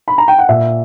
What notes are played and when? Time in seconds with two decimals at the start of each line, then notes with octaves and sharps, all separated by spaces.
0.08 B5
0.18 A#5
0.28 G5
0.39 F#5
0.49 A#2 E5